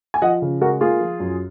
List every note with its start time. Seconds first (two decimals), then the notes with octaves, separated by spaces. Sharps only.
0.14 G#5
0.22 F3 D#5 F#5
0.42 C#3
0.61 G#3 F#4 A#4
0.81 A#3 F4 G#4
1.00 F3
1.20 F#2